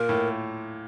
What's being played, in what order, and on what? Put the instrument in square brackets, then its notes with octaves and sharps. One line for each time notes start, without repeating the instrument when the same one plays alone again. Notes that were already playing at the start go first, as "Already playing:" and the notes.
Already playing: [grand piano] A#2 [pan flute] A#4
[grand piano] A2